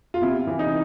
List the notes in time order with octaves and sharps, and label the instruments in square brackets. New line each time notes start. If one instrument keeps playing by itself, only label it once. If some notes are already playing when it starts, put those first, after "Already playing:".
[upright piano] F4
C3 E4
E3
D#4